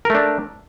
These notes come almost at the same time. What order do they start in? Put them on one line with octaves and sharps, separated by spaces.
A#4 A3 D4